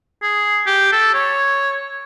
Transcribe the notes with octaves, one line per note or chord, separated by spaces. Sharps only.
G#4
G4
A4
C#5